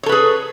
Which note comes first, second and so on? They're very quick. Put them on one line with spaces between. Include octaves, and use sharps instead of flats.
C#5 A4 B4 G#4